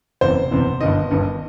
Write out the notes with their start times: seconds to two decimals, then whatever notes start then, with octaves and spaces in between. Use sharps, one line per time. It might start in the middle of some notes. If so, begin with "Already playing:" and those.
0.21 F#1 E2 C3 C5
0.51 F#1 E2 C3
0.81 G1 G2 D#3 D#5
1.11 G1 G2 D#3